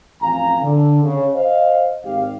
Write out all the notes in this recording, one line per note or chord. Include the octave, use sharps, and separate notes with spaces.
A1 F2 F5 G#5 A#5
D3
C#3
C5 D#5 F5
G#1 G4 F5